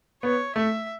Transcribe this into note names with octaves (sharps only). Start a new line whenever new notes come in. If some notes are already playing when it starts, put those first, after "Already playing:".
B3 C#5
A3 E5